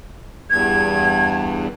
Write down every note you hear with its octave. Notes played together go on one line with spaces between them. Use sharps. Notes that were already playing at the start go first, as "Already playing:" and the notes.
E2 G2 G#6